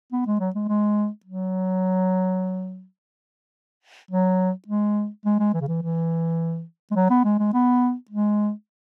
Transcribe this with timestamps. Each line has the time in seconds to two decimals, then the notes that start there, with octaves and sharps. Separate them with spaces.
0.12 B3
0.26 G#3
0.40 F#3
0.55 G#3
0.68 G#3
1.25 F#3
4.11 F#3
4.68 G#3
5.25 G#3
5.39 G#3
5.54 E3
5.61 C#3
5.68 E3
5.83 E3
6.91 G#3
6.96 F#3
7.10 B3
7.24 G#3
7.39 G#3
7.53 B3
8.10 G#3